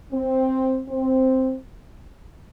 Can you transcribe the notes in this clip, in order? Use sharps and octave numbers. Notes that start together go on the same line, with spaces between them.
C4
C4